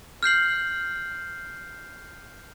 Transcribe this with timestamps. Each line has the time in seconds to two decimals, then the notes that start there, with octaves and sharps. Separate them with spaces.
0.23 F6 G6 C7 F#7